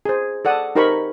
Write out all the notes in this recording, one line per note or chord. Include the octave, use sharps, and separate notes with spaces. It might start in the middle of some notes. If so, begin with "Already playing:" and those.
G#4 C5
A4 D5 F#5 A5 D#6
D#4 G4 A#4 C5 B5 C#6